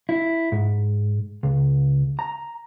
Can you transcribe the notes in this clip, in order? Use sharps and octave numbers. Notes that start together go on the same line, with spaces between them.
E4
G#2
C#2
A#5